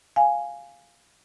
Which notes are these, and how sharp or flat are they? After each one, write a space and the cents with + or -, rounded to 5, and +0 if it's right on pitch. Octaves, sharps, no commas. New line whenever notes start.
F5 +0 G#5 +0